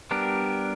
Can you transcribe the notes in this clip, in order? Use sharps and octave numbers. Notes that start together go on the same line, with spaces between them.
G3 B3 D4 G4 A#4